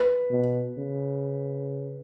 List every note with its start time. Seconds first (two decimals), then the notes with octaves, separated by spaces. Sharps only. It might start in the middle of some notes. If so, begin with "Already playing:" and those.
Already playing: B4
0.31 B2
0.78 C#3